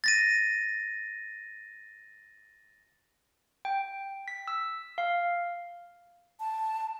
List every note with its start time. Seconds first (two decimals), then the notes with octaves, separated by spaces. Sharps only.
0.04 A6 A#6 D#7
3.65 G5
4.28 B6
4.48 E6
4.98 F5
6.40 A5